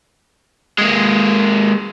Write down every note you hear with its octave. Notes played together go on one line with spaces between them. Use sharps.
G#3 A#3